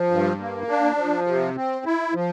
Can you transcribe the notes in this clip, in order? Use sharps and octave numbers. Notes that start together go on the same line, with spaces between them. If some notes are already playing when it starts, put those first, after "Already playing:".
Already playing: F3
G2
A#3
D4
F3
C3
C4
E4
F3